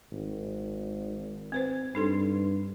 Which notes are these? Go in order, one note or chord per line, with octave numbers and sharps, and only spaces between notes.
G#1
C4 B4 C5
G2 D#4 A4 C6